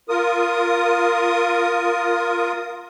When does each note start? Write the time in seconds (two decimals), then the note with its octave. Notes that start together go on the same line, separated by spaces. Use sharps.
0.09 F4 A#4 D#6